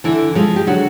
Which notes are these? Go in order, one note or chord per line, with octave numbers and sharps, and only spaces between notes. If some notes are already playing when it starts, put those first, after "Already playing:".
D3 E3 E4
F3 G#3 F4
G4
D3 F#3 F#4